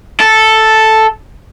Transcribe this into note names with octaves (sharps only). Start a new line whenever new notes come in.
A4